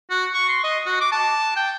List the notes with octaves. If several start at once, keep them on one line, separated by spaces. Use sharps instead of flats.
F#4
C#6
C6
D#5
F#4
D6
A5
G5